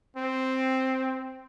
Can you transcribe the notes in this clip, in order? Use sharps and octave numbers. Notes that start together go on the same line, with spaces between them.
C4